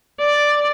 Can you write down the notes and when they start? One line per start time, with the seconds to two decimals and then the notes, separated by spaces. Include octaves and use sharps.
0.19 D5